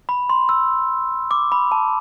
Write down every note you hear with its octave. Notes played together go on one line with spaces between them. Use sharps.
B5
C6
E6
D6
B5
A5